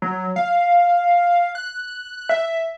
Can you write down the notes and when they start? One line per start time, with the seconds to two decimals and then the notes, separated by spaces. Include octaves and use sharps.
0.02 F#3
0.36 F5
1.55 F#6
2.29 E5